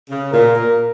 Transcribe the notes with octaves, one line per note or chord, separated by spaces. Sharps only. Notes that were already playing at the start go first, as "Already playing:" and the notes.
C#3
A#2 A#4
A#2